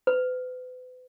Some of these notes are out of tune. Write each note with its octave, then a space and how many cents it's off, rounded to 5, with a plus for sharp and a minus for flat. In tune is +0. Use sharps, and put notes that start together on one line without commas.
B4 +40